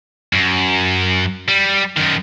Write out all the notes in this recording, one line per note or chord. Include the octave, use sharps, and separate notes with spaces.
F#2
G3
F#2 D#3